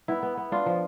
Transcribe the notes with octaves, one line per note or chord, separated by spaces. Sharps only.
B3 E4
B3
B3
D4 F4
F3